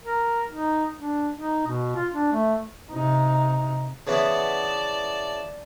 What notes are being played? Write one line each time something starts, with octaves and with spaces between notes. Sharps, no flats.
A#4
D#4
D4
D#4
B2
F4
D4
A3
C3 D#4
C#3 E3 B3 D5 A5